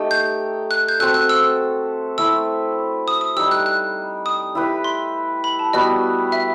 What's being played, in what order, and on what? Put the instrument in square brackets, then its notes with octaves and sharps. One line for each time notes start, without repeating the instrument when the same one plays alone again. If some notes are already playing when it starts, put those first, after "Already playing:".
Already playing: [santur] A3 D#4 G4 D#5
[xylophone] G6
F#6
G6
[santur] C4 F#4 A4 E5 [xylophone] F#6
[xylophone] F#6
E6
[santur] A3 C4 E4 [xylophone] E6
[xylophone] D#6
D#6
[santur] G3 D#4 G4 [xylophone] E6
[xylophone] F#6
F#6
D#6
[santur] E4 G4 B4
[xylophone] C6
B5
A5
[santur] G3 B3 F#4 [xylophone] D#5
[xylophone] E5